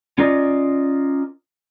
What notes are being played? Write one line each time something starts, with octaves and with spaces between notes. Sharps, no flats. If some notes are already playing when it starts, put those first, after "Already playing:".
C#4 F4 A#4 D5 D#5